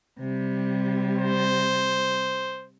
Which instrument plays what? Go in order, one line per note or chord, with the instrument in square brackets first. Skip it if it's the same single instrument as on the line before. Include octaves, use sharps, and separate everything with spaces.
[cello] C3 G3
[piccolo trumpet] C5